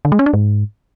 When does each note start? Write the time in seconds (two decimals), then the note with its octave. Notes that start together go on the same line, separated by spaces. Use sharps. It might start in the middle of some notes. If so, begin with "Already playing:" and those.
0.05 D3
0.12 G#3
0.19 C#4
0.26 D4
0.33 G#2